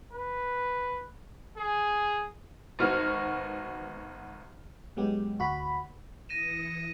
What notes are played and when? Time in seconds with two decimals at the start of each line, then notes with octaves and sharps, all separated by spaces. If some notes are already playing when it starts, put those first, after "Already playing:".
0.12 B4
1.57 G#4
2.79 G#1 B3 F#4 F6
4.97 G#2 F#3 G#3 B3 G4
5.39 D2 F#4 B5
6.29 E3 D#6 A#6 C#7 D#7 E7